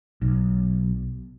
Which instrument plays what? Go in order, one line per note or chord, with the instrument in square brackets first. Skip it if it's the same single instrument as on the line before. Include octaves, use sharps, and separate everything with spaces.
[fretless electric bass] B1